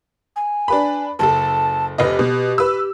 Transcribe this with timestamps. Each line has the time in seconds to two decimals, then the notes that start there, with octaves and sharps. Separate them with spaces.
0.36 G#5
0.68 D4 B4 B5
1.19 F#1 A4 A5
1.98 F1 G4 B4 D#5
2.19 B2
2.58 B4 E6